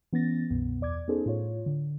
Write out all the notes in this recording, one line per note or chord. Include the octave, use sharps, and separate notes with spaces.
E3 B3 C#4 A6 A#6
C2 F#2 B2 B3
E2 D5 D6 G#6
B3 C#4 D#4 G#4 A4 C5
A2 F4 C#5
D3